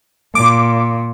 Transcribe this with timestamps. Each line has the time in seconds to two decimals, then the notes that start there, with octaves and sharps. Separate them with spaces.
0.35 A#2 D6